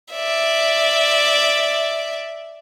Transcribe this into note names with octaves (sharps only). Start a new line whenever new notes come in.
D5 E5